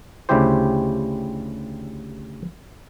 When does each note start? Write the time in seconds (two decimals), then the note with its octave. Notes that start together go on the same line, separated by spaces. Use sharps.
0.29 D2 C#3 G3 E4 G4 C5